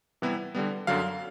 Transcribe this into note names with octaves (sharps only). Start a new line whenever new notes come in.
C3 E3 G3 B3 E4
D3 G3 B3
F#2 D3 F#3 F5